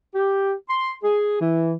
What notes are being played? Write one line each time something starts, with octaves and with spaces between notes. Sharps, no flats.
G4
C6
G#4
E3